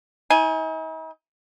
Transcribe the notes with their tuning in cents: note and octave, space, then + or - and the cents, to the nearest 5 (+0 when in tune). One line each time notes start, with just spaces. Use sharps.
D#4 +45 G#5 +0